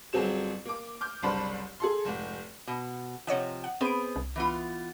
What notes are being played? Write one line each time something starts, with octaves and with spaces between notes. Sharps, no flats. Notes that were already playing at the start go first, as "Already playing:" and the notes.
G1 F#3 C4 G#4 E7
A#3 D6
D6 F6 G6
F#1 C2 D4 C5 B5
G#4 A4 C6
F1 G#2
B2
C3 F3 C#5 D#5 F#5
F#5
B3 C4 G#4 C5 D7
C2
E3 B3 F4